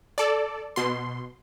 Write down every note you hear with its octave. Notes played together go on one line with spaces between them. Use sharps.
A4 D5
B2 C6